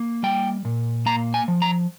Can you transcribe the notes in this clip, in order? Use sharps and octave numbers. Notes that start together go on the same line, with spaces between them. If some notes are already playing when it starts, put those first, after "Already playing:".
Already playing: A#3
G3 G5
A#2
A#3 A#5
G#5
F3
A#5